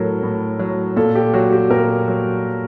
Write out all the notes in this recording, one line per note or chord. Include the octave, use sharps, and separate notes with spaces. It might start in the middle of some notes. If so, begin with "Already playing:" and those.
Already playing: A2 F#3 A4 A#4
A2
F#3
A#2 A4
G4
F#3 F#4
G4
A#2 A#4
F#3